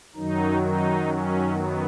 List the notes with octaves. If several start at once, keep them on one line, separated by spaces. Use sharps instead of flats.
F#2 D#3 F#3 D#4
D#4
C#4
B3